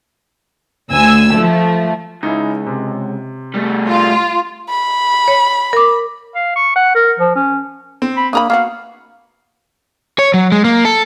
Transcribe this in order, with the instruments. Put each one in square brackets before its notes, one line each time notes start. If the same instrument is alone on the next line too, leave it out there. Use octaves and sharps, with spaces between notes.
[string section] D2 G#5 E6
F3 A3
[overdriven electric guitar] C#2 [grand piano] D#4 E4
[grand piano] C3
[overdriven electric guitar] G3 A3
[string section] F4
[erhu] B5
[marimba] C#5
A#4 D6
[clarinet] F5
C#6
F#5
A#4
F3
C#4
[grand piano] C4
[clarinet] B5
[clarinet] A#3 [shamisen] D4 A#4 B5 [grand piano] D#6
[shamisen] A#3 B3 F#4 [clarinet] F5
[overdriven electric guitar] C#5
F#3
G#3
A#3
A4